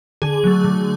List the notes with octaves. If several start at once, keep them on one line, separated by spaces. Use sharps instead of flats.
D3 G#4
F#3 A3
D3